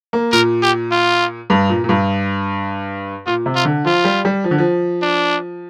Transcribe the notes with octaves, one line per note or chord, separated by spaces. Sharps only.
A#3
A#2 A#4
G4
F4
G2
A#2
A#2
G2
A#2 F4
C3
F4
D3
F3 F4
G3
G3
F3
D3
F3
D4